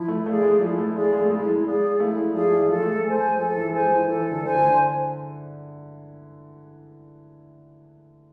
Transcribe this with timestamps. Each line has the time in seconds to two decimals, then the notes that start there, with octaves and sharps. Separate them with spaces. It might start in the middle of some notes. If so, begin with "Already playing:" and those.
Already playing: F3 E4
0.08 A3
0.26 A3 G#4 D5 F5
0.43 G#3
0.61 F3 E4
0.78 A3
0.95 G#3 G#4 D5 F5
1.13 G#3
1.25 A3
1.30 G#3 E4
1.48 G#3
1.64 G#3 G#4 D5 F5
2.00 A3 E4
2.17 G#3
2.34 F3 G#4 D5 F5
2.51 E3
2.69 F3 A4
2.82 A3
2.87 G#3
3.04 A3 C5 G#5
3.22 G#3
3.38 F3 A4
3.56 E3
3.73 G#3 C5 G#5
3.91 E3
4.08 E3 A4
4.31 D3
4.43 C5 G#5
4.55 D3